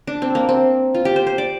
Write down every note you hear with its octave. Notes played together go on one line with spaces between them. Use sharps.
D4
C4
A#3
C4
F4
G4
C5
C5
D5